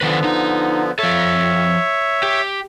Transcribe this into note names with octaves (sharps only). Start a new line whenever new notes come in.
D3 D#3 F3 B3 B4
D#4
F3 A4 C#5 E5
G4